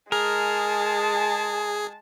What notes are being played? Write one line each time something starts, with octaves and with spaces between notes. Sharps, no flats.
G#3 G#4 A#4 A5